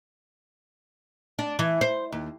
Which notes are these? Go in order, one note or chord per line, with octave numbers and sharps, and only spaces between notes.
D4
E3
C5
D#2